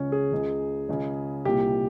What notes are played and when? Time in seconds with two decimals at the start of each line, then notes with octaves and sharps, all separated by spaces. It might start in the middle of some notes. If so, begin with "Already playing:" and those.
Already playing: C#2 C#3 C#4
0.12 G#4
0.32 C#2 C#3
0.89 C#2 C#3
1.45 C2 A#2 G4